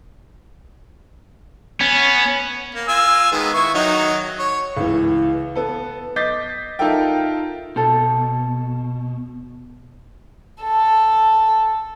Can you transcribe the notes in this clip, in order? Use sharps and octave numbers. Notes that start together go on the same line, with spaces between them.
B3 C#4
A#3
F4 G#5 E6
D#3 G#3 B3
E4 C#6
D#3 F#3 D#4
C#5
C#2 E3
B3 A4
D#5 D6 G6 A6 B6 C7
D#4 F4 A4 A#4 E5 G5
B2 A4 C5
A4